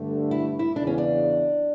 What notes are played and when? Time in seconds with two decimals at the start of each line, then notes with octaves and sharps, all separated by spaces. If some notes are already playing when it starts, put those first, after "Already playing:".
Already playing: G2 D3 A3
0.31 E4
0.59 E4
0.76 E2 C#3 E3 D4
0.87 C#4
0.98 D4